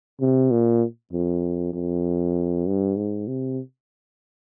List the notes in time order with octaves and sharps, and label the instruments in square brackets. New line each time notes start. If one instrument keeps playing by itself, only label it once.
[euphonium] C3
A#2
F2
F2
G2
G#2
C3